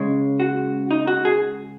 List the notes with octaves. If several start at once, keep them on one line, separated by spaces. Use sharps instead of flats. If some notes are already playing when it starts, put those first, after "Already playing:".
Already playing: C#2 C#3 G#3 C#5
F#4
D#4
F#4
G#4